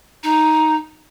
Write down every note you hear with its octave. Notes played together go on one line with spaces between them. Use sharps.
D#4